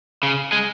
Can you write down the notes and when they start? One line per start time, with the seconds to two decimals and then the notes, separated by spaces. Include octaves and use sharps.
0.23 C#3
0.52 G#3